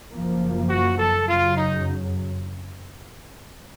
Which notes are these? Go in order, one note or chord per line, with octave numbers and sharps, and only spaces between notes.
F#1 F#2 F3 A#3
F#4
A4
F#2 C#3 F#3 F4
D#4